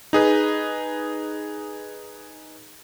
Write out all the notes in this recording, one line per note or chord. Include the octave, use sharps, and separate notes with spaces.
D#4 G#4 B4